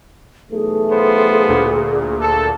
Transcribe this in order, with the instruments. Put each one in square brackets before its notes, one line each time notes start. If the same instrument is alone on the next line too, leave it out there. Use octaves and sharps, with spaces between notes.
[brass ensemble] B1 E3 A3 [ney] G#4
[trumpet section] B3 F4 C5
[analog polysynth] D2 A#2
[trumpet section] A4